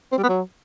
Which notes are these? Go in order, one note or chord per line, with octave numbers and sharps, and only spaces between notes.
C4
G3
B3
F#3